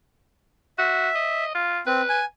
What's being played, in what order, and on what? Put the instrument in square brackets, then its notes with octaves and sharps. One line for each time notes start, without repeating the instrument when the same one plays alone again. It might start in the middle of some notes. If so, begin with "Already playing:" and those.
[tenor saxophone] F#4 [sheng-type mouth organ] E5
[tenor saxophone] D#5
F4
[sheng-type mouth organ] C4 [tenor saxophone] B4
[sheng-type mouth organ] G#5